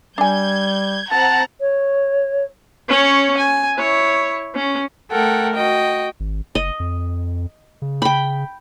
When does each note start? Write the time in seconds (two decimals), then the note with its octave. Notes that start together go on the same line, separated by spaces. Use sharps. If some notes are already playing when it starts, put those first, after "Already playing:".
0.18 G3 D4 G#5 G6 G#6
1.11 F3 C4 F#5 A5 A#5
1.61 C#5
2.89 C#4 C#5
3.37 G#5
3.77 E4 C#5
4.55 C#4
5.11 A3 A4 A#4 F#5 G5
5.54 F#4 D#5 G5
6.20 G#1
6.55 F#1 D#5
6.80 F2
7.82 C#3
8.02 G5 B5